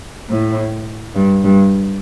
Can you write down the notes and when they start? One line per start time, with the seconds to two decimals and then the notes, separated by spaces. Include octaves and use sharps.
0.29 A2
1.16 G2
1.45 G2